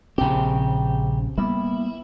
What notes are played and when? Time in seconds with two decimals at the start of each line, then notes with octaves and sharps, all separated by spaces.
0.18 A#1 C#3 C4 G4
1.38 G3 A#3 B3 E4